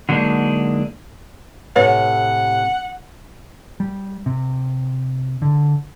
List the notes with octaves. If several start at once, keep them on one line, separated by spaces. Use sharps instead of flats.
D3 F#3 G#3 A#3 D4 D#4
A2 C3 B4 C#5 F#5
G3
C3
D3